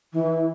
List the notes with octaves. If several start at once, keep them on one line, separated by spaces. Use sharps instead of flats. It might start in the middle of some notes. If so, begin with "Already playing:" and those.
E3